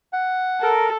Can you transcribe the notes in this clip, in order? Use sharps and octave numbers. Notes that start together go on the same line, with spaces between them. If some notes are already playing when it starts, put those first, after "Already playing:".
F#5
A4 A#4